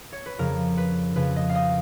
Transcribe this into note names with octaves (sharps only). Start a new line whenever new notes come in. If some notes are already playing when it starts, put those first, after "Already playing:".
C#5
B4
F2 C#3 F3 A#4
B4
F2 C#3 F3 B4
D#5
F5
D#5